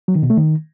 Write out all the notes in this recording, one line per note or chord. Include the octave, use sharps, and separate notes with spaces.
F#3
D#3
B2
A3
D#3